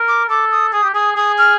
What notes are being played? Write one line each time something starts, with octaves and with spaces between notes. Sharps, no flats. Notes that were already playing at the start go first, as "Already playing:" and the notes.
Already playing: A#4
D6
A4 D6
D#6
G#4 D#6
G4
G#4 D#6
G#4 D#6
F6